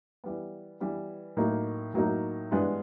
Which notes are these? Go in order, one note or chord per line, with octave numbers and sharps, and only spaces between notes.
E3 G3 B3
E3 G3 B3
A2 F#3 A#3 D#4
A2 F#3 A#3 D#4
G2 E3 G#3 B3 D4